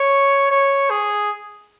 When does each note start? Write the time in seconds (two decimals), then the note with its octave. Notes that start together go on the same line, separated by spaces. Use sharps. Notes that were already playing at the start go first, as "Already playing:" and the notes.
Already playing: C#5
0.51 C#5
0.90 G#4